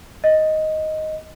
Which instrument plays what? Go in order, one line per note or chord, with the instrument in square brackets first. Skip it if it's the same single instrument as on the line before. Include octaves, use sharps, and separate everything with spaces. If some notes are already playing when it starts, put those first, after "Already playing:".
[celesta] D#5